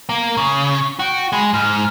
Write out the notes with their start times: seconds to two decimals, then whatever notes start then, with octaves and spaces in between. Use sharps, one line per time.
0.09 A#3
0.37 C#3
0.99 F#4 G5
1.33 G#3 B5
1.54 G#2 F6